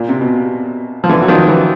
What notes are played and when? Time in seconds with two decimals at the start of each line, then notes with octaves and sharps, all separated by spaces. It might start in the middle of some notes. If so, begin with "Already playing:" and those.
Already playing: A#2
0.09 C3
0.21 B2
1.04 F3
1.09 D3 E3
1.21 F#3
1.28 D#3 F3
1.48 E3 F#3